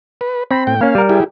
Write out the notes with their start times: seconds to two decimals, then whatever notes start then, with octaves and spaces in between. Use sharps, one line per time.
0.21 B4
0.51 C4 B5
0.67 A2 G5
0.81 A#3 C#4 F5
0.95 G3 A#4
1.09 E4 G4 G#4